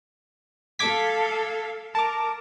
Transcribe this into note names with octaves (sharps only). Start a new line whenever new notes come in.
A4 F5 D6 G#6 B6
A#4 A5 D6